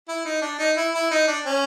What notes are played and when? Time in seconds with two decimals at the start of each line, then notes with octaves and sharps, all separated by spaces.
0.08 E4
0.25 D#4
0.42 D4
0.59 D#4
0.76 E4
0.94 E4
1.11 D#4
1.28 D4
1.45 C#4